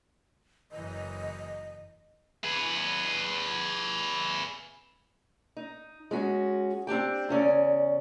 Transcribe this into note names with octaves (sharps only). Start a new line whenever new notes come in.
F#1 E3 D#5
G#4 B4
D#4
G#3 C#4 F#4
C4 D4 G4 G5
E2 C#3 C#4 D5